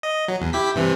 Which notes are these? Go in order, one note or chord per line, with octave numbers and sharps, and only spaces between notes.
D#5
F#3
E2
E4 G4 B6
G2 C3 E3